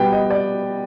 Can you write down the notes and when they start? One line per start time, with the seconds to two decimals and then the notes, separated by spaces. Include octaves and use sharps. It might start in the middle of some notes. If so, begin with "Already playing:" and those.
Already playing: B2 G3 B3 G5
0.12 D#5
0.30 D5